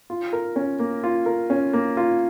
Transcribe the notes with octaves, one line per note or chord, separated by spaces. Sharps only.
F4
A#4
C#4
A#3
F4
A#4
C#4
A#3
F4